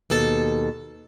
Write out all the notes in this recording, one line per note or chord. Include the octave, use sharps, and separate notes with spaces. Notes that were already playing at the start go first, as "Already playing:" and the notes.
D#2 B2 A4 A5